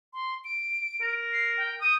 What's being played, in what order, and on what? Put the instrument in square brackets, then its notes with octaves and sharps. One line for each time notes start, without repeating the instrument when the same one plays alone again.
[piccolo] C6
D7
[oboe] A#4
[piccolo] C7
G5
[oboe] D#6 [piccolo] G6